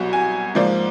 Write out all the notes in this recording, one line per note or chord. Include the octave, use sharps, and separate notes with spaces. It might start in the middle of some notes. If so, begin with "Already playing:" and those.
Already playing: C2 B2 F#3
G#5
G#2 F3 A#3 D5